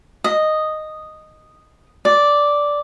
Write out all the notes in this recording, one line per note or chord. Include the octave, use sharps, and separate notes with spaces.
D#5
D5